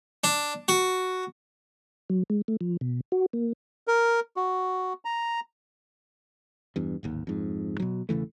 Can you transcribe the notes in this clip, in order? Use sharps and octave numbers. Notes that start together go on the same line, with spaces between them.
D4
F#4
F#3
G#3
A3
F3
B2
F#4
A#3
A#4
F#4
A#5
E2 G2
D1 G#1 D#2
F2 G#2
B2 F#3
E1 C#3 E3 A3